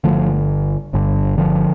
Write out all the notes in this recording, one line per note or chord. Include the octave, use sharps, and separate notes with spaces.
G1 G2 D3 F3 A3
G1 G2 D3
D3 F3